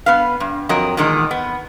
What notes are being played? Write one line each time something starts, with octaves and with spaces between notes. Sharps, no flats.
B3 B4 F5
G2
F2 F#3 A#4 D#5
E2 A#2 D#3 G#3 D#4
B3